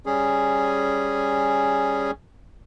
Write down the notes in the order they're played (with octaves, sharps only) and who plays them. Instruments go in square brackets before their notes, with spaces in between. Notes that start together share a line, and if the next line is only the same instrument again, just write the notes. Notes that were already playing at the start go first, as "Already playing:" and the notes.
[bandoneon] G3 C#4 G#4